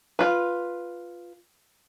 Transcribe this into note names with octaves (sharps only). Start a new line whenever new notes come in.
F4 B4